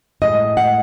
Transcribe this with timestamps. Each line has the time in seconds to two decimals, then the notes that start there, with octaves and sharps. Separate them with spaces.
0.22 A2 G#3 D#5
0.57 F#5